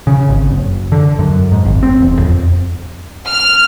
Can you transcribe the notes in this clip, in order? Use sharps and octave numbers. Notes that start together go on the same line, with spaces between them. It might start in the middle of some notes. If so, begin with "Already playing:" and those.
C#3
G#1
F#1
D3
F#2
G#2
G#1
C4
E1
F2
F6